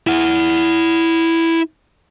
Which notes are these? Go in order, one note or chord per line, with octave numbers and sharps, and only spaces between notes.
E4 F#5